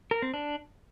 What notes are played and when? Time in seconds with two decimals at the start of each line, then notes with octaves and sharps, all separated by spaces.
0.11 A#4
0.22 C4
0.34 D4